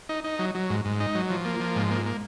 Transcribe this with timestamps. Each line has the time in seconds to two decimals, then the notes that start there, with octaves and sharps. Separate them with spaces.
0.09 D#4
0.24 D#4
0.39 F#3
0.55 F#3
0.70 G#2
0.85 G#2
1.00 D#4
1.15 F#3
1.30 F3
1.45 A#3
1.60 F3
1.76 G#2
1.91 A#3
2.06 A#3